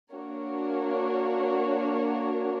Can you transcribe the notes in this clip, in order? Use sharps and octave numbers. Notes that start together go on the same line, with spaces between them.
A#3 D4 F#4 A#4 C#5